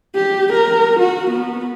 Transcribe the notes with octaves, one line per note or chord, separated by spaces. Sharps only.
G4
A#4
F#4
B3